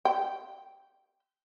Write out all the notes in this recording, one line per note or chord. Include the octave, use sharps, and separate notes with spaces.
G5